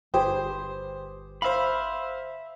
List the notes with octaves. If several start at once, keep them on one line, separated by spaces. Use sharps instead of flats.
G1 G4 G#4 B4 C5
C5 E5 F5 B5